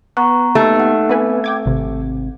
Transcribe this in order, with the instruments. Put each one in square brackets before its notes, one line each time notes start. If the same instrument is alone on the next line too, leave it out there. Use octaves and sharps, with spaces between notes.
[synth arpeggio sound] B3 [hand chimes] F#5 A#5 C#6
[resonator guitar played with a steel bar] A3 [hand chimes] A#3 D#4 G4
[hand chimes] D#4 F#5
[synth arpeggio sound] B3 B4 G#5 [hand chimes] C4
[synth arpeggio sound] G5 D6 G#6
G#1 C3